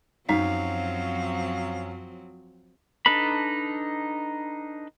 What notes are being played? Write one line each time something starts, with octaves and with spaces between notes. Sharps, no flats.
F#2 F3 F#3 C4 D#4 F5
D4 D#4 A4 B4 B5